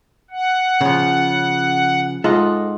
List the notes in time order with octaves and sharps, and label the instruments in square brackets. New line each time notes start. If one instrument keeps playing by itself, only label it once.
[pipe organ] F#5
[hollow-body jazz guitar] C#3 F3
[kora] G#2 F4 F#5 [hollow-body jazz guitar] A4 D#5